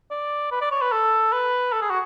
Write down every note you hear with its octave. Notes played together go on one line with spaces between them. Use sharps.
D5
B4
D5
C#5
B4
A4
B4
A4
G#4
F#4